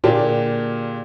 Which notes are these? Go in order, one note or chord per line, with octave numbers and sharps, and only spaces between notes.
A#2 D3 A#3 D4 G4 G#4